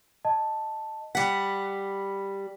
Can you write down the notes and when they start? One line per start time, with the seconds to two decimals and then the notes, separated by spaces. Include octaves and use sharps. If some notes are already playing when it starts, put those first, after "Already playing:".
0.25 D#5 A5
1.15 G3 F#5 G5 B6